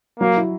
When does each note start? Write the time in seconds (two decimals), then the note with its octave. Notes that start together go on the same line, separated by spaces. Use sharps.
0.20 F#3 A#3
0.37 E4